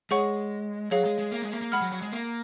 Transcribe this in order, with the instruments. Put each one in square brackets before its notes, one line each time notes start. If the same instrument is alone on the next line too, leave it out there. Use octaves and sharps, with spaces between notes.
[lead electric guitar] G#3 [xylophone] G#4 C#5 F#5 C#6
[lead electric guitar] F#3 [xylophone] G#4 C#5 F5
[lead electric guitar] G#3
G#3
A#3
G#3
A#3
A#3
[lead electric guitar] G#3 [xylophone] F#5 B5 F6
[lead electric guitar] F#3
F#3
G#3
A#3